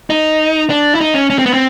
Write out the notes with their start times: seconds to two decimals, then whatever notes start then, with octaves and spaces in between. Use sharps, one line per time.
0.10 D#4
0.70 D4
0.95 E4
1.01 D#4
1.14 C#4
1.30 C#4
1.39 C4
1.46 B3
1.54 C4